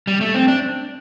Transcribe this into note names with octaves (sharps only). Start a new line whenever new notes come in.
G3
A3
C4
D4